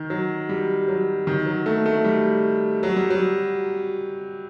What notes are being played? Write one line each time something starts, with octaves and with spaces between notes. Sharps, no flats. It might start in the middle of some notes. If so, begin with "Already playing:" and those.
Already playing: D#3
F#3
G3
F#3
D#3
F#3
A3
A3
G3
F#3
G3
F#3